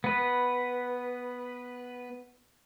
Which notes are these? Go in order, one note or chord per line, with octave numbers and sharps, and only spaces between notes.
B3 B4